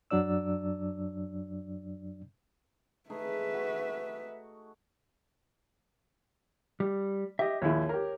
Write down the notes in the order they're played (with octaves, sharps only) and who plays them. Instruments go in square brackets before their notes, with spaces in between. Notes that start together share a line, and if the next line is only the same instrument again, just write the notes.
[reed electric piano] F#2 F#3 D4 D5 E6
[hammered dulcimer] A3 D#4 G#4 [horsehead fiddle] B4 E5
[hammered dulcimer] F#4
[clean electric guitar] G3
[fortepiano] G4 [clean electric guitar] D#5 E5
[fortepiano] A#1 D#2 E4 [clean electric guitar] C#5
[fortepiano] G4 A#4